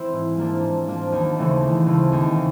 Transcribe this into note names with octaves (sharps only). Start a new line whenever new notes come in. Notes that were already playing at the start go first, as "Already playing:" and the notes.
Already playing: E3 C4 E4
G#2
F3 A#3 D4
G#2
F3 A#3 D4
D#2
C#3 E3 A3 C4
D#2
C#3 E3 A3 C4
D#2
C#3